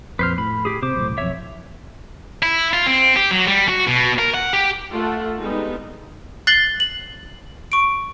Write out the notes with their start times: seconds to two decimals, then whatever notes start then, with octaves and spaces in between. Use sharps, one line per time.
0.19 A#1 F2 B4 C5 F6
0.38 A2 B5
0.65 G4 G#4
0.83 C3 C5 D6
0.95 B1 E2 A2
1.18 B1 F2 C#5 E5
2.43 E4
2.73 F4
2.86 C4
3.16 G4
3.31 F#3
3.48 G3
3.69 F#4
3.88 B2
4.19 A#4
4.34 F#5
4.53 G4
4.92 A3 F4 A4 F#5
5.40 G3 G#3 B3 D#4
6.47 F#6 A6 C7 F#7 G7
6.80 F#7
7.72 C#6 D7